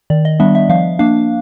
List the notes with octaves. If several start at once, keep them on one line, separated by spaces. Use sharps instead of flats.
D#3 D5
D#5
G3 B3 D4 E5
E5
F3 F5
A#3 D4 F5